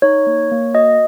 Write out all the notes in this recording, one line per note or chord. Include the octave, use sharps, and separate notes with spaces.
D#4 C#5
A#3
A#3
F#4 D#5